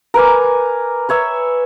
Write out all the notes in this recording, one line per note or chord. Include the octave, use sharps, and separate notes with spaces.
A#4 B4 G#5 D6
B4 C#5 E5